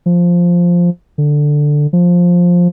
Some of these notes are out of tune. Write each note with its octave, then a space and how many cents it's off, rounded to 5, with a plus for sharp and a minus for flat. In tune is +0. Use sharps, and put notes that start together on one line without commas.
F3 +0
D3 +5
F3 +10